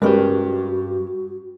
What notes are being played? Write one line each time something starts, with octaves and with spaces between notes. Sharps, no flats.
G2 G3 G#3 C#4 F#4 G4 A#4 B4